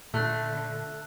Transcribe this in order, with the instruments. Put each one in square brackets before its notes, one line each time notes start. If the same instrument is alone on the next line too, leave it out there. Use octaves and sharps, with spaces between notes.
[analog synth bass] A#2 [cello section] D3 [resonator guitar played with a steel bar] A3 [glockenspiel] E6 F#6